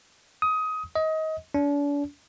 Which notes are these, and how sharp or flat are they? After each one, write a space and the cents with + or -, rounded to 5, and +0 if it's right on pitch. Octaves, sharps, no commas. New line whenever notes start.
D#6 +20
D#5 +25
D4 -40